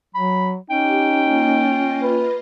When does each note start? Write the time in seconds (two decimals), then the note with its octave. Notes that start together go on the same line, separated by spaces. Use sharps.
0.15 F#3 B5
0.70 C#4 D#4 G4 G5
1.23 A#3 F4 D#5
2.02 B4